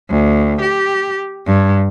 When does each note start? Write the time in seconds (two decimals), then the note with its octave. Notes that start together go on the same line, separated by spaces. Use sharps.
0.10 D2
0.61 G4
1.46 G2